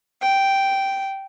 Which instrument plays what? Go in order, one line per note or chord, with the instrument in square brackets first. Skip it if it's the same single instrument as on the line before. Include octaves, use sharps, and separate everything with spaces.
[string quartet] G5